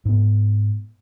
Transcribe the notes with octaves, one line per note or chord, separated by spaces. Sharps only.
G#2 B3